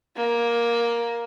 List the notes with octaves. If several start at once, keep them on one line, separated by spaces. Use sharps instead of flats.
A#3